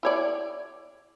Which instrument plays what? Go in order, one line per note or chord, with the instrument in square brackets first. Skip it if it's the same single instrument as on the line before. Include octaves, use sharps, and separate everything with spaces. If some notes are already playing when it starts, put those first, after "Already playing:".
[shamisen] E4 C#5 D5